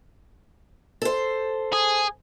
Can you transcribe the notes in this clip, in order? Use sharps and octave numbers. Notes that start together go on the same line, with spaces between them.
A4 C5
G#4